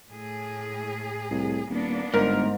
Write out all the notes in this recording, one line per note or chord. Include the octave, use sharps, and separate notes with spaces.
A2 G#4
C2
D#1 A#3 B3 D4
G1 G#2 A#4